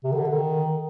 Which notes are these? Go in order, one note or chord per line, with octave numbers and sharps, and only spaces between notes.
C3
D#3
D3
D#3